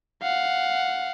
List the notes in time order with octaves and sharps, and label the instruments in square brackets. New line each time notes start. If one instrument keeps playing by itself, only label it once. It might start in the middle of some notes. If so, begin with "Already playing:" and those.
[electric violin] F5 F#5